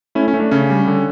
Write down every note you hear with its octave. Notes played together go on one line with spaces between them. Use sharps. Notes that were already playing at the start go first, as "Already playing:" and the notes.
A3 C#4 E4
C#4
A3
D4
C#3 C#4
G3
D3